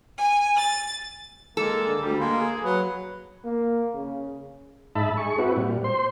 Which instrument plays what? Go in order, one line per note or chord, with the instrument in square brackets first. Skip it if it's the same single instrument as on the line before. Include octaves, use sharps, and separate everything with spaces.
[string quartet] G#5
A6
[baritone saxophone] G#3 [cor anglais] A#3 [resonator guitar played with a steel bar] A4
[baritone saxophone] D3
[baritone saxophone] D2 [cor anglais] G3
[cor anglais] G#3 [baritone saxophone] A#3
[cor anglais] G#4
[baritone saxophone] F#3 [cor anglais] B4
[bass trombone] A#3
C#3
[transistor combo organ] G#2 D#4 E5 A5 B5
G#4 C#6
C4 E4 F#4 B4
A#2 G3
C5 C6